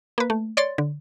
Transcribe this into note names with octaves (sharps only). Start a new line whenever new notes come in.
A#3 B4
A3
C#5 D5 C6 A6
D3